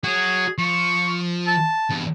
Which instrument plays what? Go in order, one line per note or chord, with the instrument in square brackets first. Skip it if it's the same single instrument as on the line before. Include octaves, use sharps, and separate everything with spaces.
[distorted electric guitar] F#4 C#5 [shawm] G#4
[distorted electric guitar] F3 [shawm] C#6
[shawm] A5
[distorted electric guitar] E2 G2